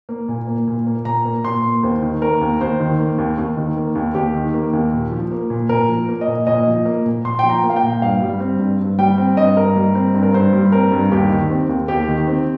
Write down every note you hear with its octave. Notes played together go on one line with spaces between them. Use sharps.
A#3
A#2
A#3
A#2
A#3
A#2 A#5
A#3
A#2 C6
A#3
D#2 C5
D#3
A#3 A#4
D#2
D#2 C5
D#3
A#3
D#2
D#2
D#3
A#3
D#2
D#2 G4
D#3
A#3
D#2
A#2
F3
A#3
A#2
A#2 A#4
F3
A#3
D#5
A#2
A#2 D#5
F3
A#3
A#2
A#2 C6
F3 G5
A#5
A#3
F5
G5
A#2
G2 F5
G3
C4
G2
G2
G3 G5
C4
G2 D#5
G2 A#4
G3
C4
G2
A#4
G2 C5
G3
C4 A#4
G2
D#2 G4
D#3
C4
D#2
D#2 G4
D#3
C4